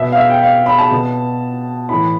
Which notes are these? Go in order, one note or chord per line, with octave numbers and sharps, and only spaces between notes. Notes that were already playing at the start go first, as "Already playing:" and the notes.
Already playing: B2 E5
F5
E5
G5
F5
B5
A5
B2
A2 E3 B5